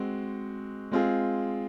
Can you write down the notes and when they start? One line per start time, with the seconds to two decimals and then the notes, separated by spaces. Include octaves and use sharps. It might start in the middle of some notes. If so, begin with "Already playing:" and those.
Already playing: G#3 C4 F#4
0.92 G#3 C4 F4 G#4